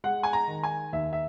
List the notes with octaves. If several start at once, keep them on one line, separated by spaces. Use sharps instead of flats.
G#3 F#5
G#5
A#5
D#3
G#5
D#2 E5
E5